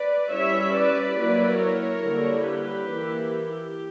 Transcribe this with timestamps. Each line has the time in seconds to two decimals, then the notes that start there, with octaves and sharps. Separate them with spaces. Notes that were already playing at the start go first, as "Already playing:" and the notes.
Already playing: B4 D5
0.32 G3 C#4 E4 C#5 E5
0.75 B4 D5
1.17 F#3 A#3 E4 B4 D5
1.59 A#4 C#5
2.01 D3 G3 A#3 E4
2.43 G4 B4
2.86 E3 A#3 E4
3.29 G4